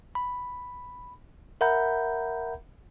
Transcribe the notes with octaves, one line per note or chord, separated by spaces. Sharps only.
B5
A#4 E5 F#5 A#5 B5 G6